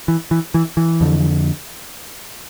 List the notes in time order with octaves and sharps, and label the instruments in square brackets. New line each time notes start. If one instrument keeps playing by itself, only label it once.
[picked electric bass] E3
E3
E3
E3
F2 D3